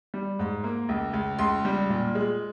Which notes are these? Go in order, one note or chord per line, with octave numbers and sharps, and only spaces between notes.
G3
G#2
A#3
C#2
C#2
C#2 C6
G3
A#2
G#3